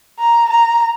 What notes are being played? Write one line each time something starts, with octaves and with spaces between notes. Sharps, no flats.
A#5
A#5